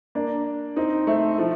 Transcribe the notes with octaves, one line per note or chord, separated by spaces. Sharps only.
A#3 D4
C4 D#4
A3 C4
F3 A3